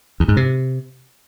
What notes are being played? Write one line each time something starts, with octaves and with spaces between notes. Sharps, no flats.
E2
G#2
C3